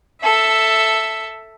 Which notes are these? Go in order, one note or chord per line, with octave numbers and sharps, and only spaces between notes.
A4 E5